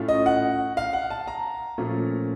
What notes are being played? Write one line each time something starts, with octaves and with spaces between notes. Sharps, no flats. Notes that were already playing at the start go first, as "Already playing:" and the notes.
Already playing: A2 A3 C#4 F4
D#5
F#5
F5
F#5
A5
A#5
A#2 F3 A3 C#4 F4